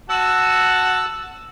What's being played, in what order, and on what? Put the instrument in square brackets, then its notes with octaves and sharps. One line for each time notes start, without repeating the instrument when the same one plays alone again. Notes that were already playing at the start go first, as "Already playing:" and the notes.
[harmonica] F#4 F#5 A5 [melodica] E6